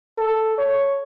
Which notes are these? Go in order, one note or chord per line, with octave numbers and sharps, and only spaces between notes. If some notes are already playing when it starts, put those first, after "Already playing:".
A4
C#5